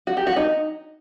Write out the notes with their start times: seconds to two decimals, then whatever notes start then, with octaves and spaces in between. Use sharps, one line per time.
0.07 F#4
0.17 G4
0.27 F#4
0.36 D#4